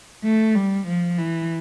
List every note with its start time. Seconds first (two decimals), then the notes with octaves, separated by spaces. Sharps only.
0.24 A3
0.55 G3
0.87 F3
1.18 E3